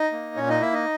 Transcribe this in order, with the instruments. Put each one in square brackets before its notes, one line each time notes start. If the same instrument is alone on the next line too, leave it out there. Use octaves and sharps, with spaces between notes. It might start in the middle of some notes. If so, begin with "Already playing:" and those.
Already playing: [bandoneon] D#4 D#5
A#3
A#2 C#4 C#5
D#4 D#5
A#3 E4 E5
D#4 D#5